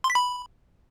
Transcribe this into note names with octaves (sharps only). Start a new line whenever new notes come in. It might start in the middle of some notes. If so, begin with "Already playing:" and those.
C6
B6
B5